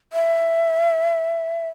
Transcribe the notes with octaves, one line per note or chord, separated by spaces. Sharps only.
E5